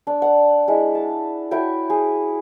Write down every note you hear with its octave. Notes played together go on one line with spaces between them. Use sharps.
D4
F#5
G#3 E4
A5
E4 F#4 C#5 G5
G#4